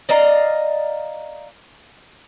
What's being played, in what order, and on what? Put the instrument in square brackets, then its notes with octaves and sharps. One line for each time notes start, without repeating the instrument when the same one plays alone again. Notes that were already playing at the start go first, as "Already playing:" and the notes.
[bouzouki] D5 D#5 F5 A#5